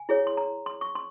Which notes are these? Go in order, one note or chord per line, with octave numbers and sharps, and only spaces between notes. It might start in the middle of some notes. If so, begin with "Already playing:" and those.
Already playing: G#5
E4 G#4 C#5
C6
A#5
C6
C#6
C6